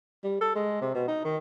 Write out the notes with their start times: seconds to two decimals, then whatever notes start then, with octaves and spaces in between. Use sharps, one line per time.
0.24 G3
0.41 A4
0.55 G#3
0.82 C3
0.95 B2
1.08 D#4
1.24 D#3